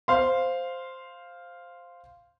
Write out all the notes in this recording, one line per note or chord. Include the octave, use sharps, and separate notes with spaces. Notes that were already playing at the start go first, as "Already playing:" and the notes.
C5 F5 C6